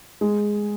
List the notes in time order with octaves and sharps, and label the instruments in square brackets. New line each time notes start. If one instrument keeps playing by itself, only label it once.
[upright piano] G#3